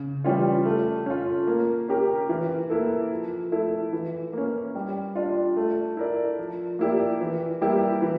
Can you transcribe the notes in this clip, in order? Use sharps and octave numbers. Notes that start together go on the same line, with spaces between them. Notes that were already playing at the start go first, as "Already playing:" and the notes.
Already playing: C#3
E3 G3 C#4 F4
A3
C#4 F4
A#3
C#4 G4 A#4
E3
A#3 E4 A4
F3
A3 E4 A4
E3
A#3 C#4
G3
D4 F4
A3
E4 A#4 D5
F3
A#3 E4 G4 D5
E3
G3 A#3 E4 G4
E3